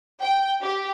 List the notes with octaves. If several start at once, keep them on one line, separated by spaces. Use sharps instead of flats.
G5
G4